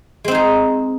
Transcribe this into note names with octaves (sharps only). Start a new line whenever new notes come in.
G#3 C4 D#4 G#4